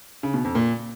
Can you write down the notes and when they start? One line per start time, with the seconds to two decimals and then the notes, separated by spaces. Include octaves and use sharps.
0.23 C#3
0.34 B2
0.45 F2
0.55 A#2